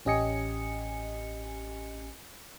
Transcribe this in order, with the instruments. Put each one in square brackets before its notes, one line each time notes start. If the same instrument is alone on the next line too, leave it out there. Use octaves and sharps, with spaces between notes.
[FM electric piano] A1 C#4 G4 D#5 G#5 C#7